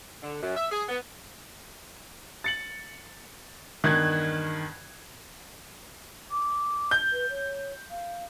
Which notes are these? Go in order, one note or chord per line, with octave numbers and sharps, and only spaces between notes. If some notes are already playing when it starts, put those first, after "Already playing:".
D3
F#2
E5
G#4
B3
A6 C#7 F#7
E2 G2 D#3 F#6 G#6
D6
G6
B4
C#5
F5